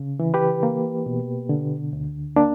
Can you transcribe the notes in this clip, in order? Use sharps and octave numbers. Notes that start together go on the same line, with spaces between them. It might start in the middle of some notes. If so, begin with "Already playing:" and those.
Already playing: C#3
E3
G4 B4
A#3
B2
D3
D2
A#3 D4